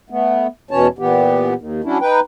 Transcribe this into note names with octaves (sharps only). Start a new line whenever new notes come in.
A3 B3
E2 B2 E3 C#4 C#5 A5
A#2 E3 B3 G4
D#2
F#3 C#4 D4 E4
D#4 B4 G5